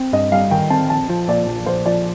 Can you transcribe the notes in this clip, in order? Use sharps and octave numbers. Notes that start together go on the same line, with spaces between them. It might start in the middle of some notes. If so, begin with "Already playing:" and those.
Already playing: C4
G2 D#5
G3 F5
D#3 G5
C4 A5
A#1 A5
F3
A#2 D5
A#1
A#1 C5
F3 D5